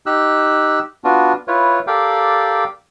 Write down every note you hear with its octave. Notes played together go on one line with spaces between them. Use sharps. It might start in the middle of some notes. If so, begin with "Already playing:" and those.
D#4 G4 E6 F#6
B3 D4 F4 F#4
E4 F4 B4 C#5
G4 A4 A#4 D5 F5 G5